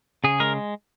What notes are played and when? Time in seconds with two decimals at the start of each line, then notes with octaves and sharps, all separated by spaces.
0.24 C#3 G#4
0.40 G#3 A#4